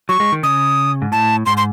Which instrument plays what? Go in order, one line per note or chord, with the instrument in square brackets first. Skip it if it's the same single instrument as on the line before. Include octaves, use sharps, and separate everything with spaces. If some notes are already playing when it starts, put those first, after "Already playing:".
[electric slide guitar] F#3 [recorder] C#6
[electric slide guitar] G#3
D#3
[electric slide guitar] C#3 [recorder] D#6
[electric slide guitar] G#2
[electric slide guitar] A2 [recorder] A5
[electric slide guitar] G#2 [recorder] C6
[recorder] C6